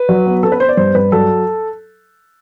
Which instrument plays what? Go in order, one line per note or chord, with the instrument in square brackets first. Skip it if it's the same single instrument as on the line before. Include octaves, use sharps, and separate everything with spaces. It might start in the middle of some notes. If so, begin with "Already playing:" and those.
Already playing: [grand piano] B4
F#3
B3
B3 A4
B4
B3 C5
D5
G2 C5
G2 B4
F#3 A4